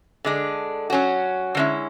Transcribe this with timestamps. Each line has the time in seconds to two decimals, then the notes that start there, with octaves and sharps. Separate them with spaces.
0.25 D3 G#3 D4
0.90 F#3 C#4 F#4
1.55 D3 G#3 C#4 E4